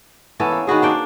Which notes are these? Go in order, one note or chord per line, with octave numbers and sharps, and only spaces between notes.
E3 B3 C#4 A4
A#3
D#3 B3 F#4 G#4
A#3 D4 G5